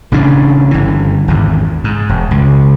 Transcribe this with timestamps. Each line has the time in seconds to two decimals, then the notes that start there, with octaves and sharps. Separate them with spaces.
0.12 A1 C#3 C#4 D4
0.71 G1 E3
1.28 G#1 E2 G#2
1.84 G#2
2.09 E1
2.31 C#2